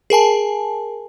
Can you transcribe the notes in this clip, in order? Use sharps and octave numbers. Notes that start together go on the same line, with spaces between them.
G#4 A#4 G#5 A5